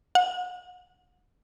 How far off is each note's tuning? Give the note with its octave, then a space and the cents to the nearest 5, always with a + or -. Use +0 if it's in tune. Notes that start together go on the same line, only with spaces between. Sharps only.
F#5 -35